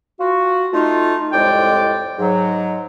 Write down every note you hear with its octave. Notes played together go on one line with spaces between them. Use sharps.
F4 F#4
A3 D#4 F4
C2 F2 A2 G#3 D5 G5
G#2 F#3